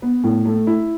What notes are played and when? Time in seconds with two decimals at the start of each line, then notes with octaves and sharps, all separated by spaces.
0.02 B3
0.24 A2
0.45 A3
0.67 E4